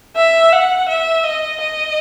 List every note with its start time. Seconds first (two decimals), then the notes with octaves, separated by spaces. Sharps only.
0.16 E5
0.53 F#5
0.89 E5
1.24 D#5
1.61 D#5